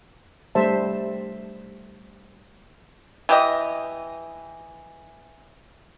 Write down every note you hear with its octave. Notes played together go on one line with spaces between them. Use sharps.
G3 A3 C5 E5 A5
E3 G4 D#5